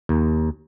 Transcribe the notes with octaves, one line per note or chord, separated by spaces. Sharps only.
D#2